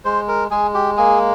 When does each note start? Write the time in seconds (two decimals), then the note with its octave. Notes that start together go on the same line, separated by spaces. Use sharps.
0.05 G#3 C5
0.28 A#4
0.51 G#3 G#4
0.74 G4
0.97 A#3 G#4